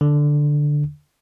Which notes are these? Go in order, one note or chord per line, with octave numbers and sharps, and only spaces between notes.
D3